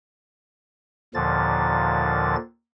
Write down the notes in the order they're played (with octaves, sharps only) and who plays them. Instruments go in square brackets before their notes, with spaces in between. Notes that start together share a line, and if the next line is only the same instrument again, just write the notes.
[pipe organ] D#2 A#2 D3 F3 A6